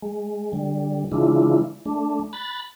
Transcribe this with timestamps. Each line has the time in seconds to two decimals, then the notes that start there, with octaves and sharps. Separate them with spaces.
0.02 G#3
0.53 D3 G3
1.12 C#3 E3 G#3 D4 E4 F4
1.86 A3 D4
2.33 B5 F#6 A6